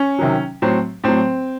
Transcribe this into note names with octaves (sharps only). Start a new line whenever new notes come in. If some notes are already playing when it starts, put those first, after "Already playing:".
Already playing: C#4
C3 D#3 F#3
A2 F#3 C4
A2 F#3 C4